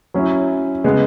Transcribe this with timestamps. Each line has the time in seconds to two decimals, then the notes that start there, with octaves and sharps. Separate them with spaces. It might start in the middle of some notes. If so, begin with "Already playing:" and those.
0.14 F#3 C#4 E4
0.84 C#3 G#3 B3